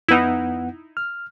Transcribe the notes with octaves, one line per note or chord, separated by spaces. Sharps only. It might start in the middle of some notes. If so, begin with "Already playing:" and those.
F2 B3 D#4 E4 F#5
F6